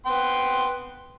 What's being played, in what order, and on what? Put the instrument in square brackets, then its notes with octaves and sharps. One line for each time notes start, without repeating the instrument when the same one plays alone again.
[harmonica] B3 G5 C6